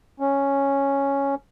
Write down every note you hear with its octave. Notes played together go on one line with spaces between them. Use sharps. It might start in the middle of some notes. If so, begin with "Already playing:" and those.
C#4